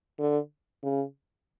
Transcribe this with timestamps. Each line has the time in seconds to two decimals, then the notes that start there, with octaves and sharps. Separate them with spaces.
0.19 D3
0.83 C#3